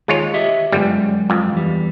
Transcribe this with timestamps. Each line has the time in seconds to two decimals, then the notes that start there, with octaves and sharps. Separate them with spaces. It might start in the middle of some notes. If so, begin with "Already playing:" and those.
0.08 D#2 G#3 F4 C#5
0.34 G4 D#5 E5
0.72 G1 F#2 G3 G#3
1.30 F2
1.52 E2 G3